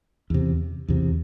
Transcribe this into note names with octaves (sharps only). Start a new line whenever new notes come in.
E2 C3
E2 C3